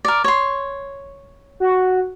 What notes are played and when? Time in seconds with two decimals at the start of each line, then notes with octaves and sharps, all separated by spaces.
0.05 A#4 D5
0.24 C#5 C6
1.60 F#4